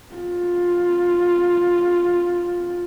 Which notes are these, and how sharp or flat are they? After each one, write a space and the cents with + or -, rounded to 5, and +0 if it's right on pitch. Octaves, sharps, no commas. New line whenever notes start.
F4 +10